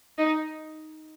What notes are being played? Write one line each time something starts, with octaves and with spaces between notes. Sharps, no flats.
D#4